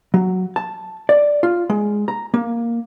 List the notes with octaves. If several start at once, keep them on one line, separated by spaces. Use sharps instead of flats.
F#3
A5
D5
F4
G#3
A#5
A#3